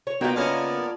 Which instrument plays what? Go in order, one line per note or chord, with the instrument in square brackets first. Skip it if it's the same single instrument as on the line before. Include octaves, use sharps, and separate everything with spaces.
[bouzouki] C#5
[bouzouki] A#3 F4 [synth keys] B3 F#4 B4 [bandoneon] D#4 G5
[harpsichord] C#3 D#4 [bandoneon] B3 D5 [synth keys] A5 F6 G#6